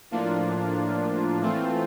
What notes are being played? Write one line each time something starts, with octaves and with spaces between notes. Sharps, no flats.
A2 F3 A#3 D4 F4
E3 A3 C4 F4